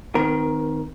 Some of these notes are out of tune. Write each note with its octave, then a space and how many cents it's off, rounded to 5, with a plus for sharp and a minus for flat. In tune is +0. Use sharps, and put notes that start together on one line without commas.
D#3 -5 C4 -45 A#4 +20